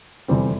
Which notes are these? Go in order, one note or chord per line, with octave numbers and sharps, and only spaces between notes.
F1 E2 C3 G3 C4